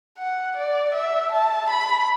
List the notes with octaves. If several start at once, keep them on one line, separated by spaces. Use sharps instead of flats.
F#5
D5
E5
A5
B5